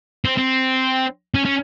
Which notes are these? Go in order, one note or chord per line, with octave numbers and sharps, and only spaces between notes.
C4
C4
C#4
C#4